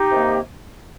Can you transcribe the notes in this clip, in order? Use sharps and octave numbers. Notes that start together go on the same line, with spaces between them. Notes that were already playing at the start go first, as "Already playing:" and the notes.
Already playing: D#4 G4
C3 D#3 A#3